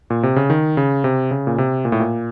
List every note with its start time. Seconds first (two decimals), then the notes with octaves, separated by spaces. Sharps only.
0.10 A#2
0.23 C3
0.36 C#3
0.50 D#3
0.77 C#3
1.04 C3
1.31 C#3
1.47 A#2
1.58 C3
1.85 A#2
1.92 A2
2.00 A#2